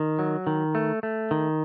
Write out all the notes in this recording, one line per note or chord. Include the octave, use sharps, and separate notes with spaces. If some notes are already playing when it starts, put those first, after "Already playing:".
Already playing: D#3
F#3
D#3
A3
A3
D#3